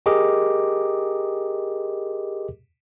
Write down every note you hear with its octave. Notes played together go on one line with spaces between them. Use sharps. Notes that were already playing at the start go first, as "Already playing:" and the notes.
G4 G#4 A#4 D#5 D6